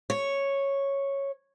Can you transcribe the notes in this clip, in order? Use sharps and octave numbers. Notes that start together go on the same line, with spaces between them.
C#5